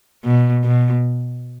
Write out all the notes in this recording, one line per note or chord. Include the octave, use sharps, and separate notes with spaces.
B2
B2